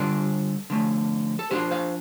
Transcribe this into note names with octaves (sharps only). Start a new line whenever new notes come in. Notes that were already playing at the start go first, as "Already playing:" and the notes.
Already playing: D3 G3 D4 F4 A4 D5
D3 F3 A3
A4
F3 D4 F4 G4 C5
C5 F5